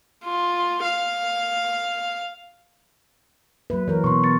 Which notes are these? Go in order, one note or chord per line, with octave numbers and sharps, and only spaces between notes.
F4
F5
F#3 A#3 B4
E3 A#4 C#5
B2 C6 C#6
B3 A6 C#7